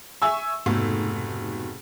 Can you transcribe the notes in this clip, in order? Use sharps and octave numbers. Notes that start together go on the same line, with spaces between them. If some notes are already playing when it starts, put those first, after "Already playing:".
E5 G#5 C#6 E6
F1 G#2 B2 A3